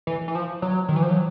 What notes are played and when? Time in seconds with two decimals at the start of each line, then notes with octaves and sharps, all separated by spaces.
0.07 E3
0.28 E3
0.35 F3
0.62 F#3
0.88 D#3
0.96 E3
1.03 F3
1.10 F#3